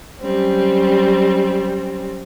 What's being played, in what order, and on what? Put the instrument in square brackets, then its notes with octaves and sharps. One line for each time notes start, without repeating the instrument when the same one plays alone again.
[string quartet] F#3 G3 C4 C#4